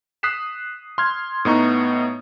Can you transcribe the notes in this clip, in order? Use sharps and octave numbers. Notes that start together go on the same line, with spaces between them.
D#6 F#6 B6 C7 E7
C6 F6 G#6
A2 B3 D#4 A#5 C#6